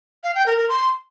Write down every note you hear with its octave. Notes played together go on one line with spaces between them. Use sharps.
F5
G5
A#4
A#4
C6